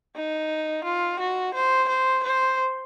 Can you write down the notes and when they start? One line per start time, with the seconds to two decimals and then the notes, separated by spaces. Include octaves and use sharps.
0.16 D#4
0.84 F4
1.19 F#4
1.54 C5
1.89 C5
2.24 C5